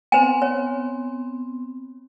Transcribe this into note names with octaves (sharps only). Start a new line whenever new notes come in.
B3 C4 C5 G#5
C#5